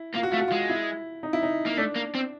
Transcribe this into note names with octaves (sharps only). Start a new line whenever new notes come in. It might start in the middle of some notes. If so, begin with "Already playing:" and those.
Already playing: E4
A#3 F4
F#4
A3 F4
F#4
G#3 F4
E4
D#4
E4
D#4
A#3
A3 D4
A#3
C4